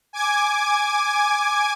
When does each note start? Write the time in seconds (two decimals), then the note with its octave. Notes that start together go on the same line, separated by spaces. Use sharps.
0.13 G#5 D6 G#6